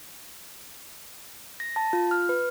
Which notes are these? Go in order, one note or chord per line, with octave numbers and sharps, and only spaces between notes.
A#6
A5
F4
F6
B4